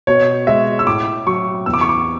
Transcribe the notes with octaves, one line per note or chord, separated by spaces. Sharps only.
B2 C#5
G#3 E5
E6
A2 D6
F#3 C#6
E2 E6
D6
C#6
D6